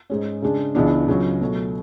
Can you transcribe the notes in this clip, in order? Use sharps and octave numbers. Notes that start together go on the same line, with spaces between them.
G#2 G#3 C#4
C#3 G#3 D4
C#2 C#3 E3 B3 D4
C#2 C#3 F#3
B2 F#3 A3